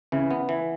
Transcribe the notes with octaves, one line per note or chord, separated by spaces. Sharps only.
C#3 E3
B3
E3